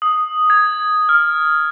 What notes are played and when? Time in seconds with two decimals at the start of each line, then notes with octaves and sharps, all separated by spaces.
0.02 D#6
0.50 G#6
1.09 F6